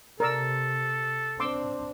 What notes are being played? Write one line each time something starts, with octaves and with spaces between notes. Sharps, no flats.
C3 A4 A#4 D5 E6
C4 D4 C6 D6 E6